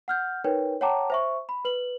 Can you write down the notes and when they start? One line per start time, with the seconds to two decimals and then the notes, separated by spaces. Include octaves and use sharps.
0.08 F#5 F6 G6
0.44 D#4 A#4 B4 C#5 G5
0.81 C#5 F#5 G5 A5 A#5 D6
1.10 C5 E5 C#6
1.49 B5
1.65 B4 F#7